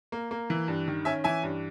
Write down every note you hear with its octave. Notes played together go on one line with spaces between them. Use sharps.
A#3
A#3
E3
G2
D#3
C#4 E5 G#5
E3 E5 G#5
G2